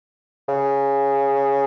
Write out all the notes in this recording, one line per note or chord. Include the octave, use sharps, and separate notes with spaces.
C#3